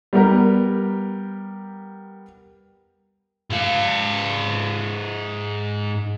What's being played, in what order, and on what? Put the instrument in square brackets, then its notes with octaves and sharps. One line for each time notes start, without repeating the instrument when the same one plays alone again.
[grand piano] G3 B3 G4 A#4
[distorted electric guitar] G#2 F5